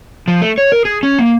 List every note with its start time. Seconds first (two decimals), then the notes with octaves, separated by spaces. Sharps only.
0.28 F3
0.41 A3
0.58 C#5
0.72 A#4
0.85 G#4
1.03 C#4
1.19 A#3